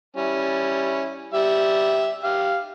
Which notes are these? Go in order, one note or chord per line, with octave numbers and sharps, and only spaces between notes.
G3 C#4 E4
G3 G4 E5
G4 F5